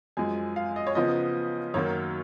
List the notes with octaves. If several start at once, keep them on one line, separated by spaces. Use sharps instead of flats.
F#2 F3 G#3 G#5
F5
D#5
C#5
C#3 F3 B3 D#5
F#2 D#3 F#3 A#3 C#5